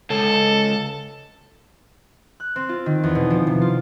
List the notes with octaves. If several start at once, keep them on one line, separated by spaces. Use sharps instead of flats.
C#2 A4
F#6
C4
F4
D#3
E2
B2
F3
C3
F4